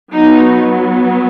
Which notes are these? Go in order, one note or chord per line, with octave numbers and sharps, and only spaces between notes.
F#3 B3 D#4